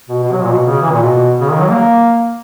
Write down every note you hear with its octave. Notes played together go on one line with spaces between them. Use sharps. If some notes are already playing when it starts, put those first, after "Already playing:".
B2
B2
F#3
A#2
B2
C#3
E3
A#2
B2
C#3
D#3
F#3
A#3